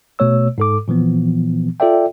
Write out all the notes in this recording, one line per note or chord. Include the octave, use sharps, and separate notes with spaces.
B2 A3 C#5 E6
G#2 A4 D6
A#2 E3 F3 B3
F4 A4 D5 E5 G5